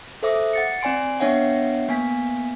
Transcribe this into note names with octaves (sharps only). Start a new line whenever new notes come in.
A4 C5 E5 D6 D#6
F#5 A6 C#7
C4 D5 G#5 C6 D7
B3 D4 C#5 E5 F#5 G5
A#3 B3 G#5 B6